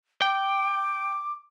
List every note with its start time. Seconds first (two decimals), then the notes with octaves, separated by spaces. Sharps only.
0.22 G5 D6